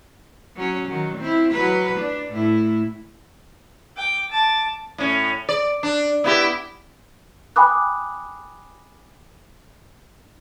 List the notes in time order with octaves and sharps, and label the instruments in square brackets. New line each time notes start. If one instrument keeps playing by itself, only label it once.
[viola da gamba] F#3 C#4
D#3 F#3
C4 E4
F#3 B4
D4
A2 E4
[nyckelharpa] G5 D6
A5 D6
[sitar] A2 C#4
D5
D4
B3 E4 G4
[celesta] G5 G#5 B5 D6 D#6 F#6